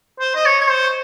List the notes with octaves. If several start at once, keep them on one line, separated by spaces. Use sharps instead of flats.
C5
D#5
C#5
C#5
C5